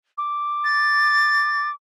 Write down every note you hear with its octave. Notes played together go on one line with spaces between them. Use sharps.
D6
A6